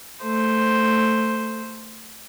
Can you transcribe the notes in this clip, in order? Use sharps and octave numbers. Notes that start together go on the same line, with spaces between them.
A3 C5